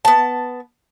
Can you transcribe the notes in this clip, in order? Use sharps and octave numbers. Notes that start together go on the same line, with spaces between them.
B3 A5